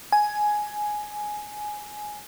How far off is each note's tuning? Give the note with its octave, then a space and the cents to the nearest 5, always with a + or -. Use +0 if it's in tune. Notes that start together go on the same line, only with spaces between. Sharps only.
G#5 +10